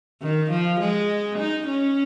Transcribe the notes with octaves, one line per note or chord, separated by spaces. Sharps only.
D#3
F3
G#3
D#4
C#4